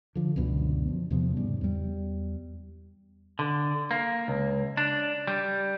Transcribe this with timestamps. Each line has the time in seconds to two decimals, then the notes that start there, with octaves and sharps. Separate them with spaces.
0.15 D3 F3
0.36 C#2 F#2 B2 D3
0.88 F3
1.11 E2 C3 F3 B3
1.37 G#2 C#3 G3
1.61 E2 G3
3.39 D3
3.91 A#3
4.28 C#2
4.77 D4
5.27 G3